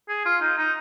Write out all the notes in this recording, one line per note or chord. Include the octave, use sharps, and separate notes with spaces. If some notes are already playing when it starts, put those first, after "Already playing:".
G#4
F4
D#4
D#4